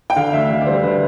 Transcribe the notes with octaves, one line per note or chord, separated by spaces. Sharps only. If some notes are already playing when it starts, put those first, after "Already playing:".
G5
D3 F5
D2 E5
D3
D5
G3 C5
D3 B4